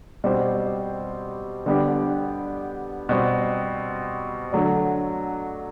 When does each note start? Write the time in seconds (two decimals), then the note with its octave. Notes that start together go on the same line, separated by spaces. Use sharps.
0.24 B2 G3 C4 G4 C5
1.66 D3 G3 B3 D4 G4
3.09 B2 G3 C4
4.52 D3 F#3 A3 D4